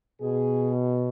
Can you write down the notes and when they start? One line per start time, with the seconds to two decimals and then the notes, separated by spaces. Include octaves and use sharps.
0.21 B2 G#4